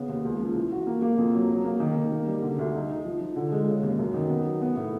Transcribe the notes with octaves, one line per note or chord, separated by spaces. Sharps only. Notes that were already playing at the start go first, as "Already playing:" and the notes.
Already playing: C#3 B3
D#2
C#2
F3
E3
F#4
A#3
A#3
F2
F#3
F#3
A#3
D#3
D#3
A#3
G3
D3
D2
D#4
D#4
F3
F3
D3
G#3
C#3
D#2
F#2
D#3
B3
F#3
B3
A2